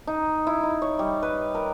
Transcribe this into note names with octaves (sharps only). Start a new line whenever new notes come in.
D#4
E4
D#4
C#5
G3
B4
A#4